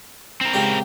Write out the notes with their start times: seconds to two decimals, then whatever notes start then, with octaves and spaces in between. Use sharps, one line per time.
0.41 C4 A#4
0.53 C#2 G4 D5